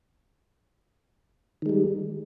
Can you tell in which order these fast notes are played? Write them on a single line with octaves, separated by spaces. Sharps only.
D#3 G#3 G3